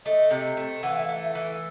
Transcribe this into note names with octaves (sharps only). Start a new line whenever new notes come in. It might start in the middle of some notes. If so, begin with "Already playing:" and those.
A3 D#5
C3
A3
E3 F#5
F5
E5
F5
A3
E5
E3